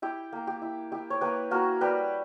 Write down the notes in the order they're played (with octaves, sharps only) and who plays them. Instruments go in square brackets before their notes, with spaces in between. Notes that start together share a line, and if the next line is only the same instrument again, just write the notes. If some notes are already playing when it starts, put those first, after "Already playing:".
[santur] E4 G4
A#3
G4
E4
E4 G4
C#5
A#3 G4 B4
A#3 F#4 A#4
G3 G4 B4